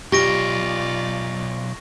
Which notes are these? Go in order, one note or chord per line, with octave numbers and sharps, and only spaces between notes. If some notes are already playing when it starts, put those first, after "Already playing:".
B1 F4 G4 D5 C#6 A#6 D7